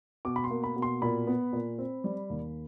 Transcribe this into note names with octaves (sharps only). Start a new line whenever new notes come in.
B2 D6
B5
C6
A#3
B5
B2
C6
A#2 B5
B3
A#2
C4
G3
D#2